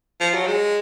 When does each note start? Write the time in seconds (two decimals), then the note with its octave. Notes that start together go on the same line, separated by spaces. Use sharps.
0.21 F3
0.34 F#3
0.47 G#3